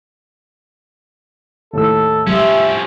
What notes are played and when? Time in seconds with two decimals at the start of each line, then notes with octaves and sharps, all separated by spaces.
1.73 D#2 A2 A4 E6
2.27 F3 G3 C#4 E5